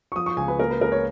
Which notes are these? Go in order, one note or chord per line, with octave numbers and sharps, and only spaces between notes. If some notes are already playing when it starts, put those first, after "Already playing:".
C#6
F3 D#6
C#6
C#2 G#5
B4
A#3 A#4
B4
C#2 A#4
C#5